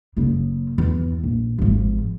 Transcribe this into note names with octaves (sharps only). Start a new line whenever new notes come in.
F#1 C#3
E2
A#1
G#1 F3